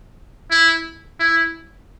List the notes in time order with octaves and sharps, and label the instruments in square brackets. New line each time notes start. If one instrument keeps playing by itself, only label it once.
[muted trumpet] E4
E4